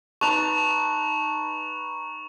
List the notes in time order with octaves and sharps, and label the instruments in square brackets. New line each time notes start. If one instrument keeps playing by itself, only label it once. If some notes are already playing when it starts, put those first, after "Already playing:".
[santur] D#4 B4 A5 [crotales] C#6 F7